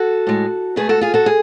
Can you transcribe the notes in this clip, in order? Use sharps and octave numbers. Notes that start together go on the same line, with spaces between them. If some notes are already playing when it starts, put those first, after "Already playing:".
Already playing: F#4 A4
A2 G#3
B2 A3 G#4 B4
F#4 A4
F4 G#4
F#4 A4
G#4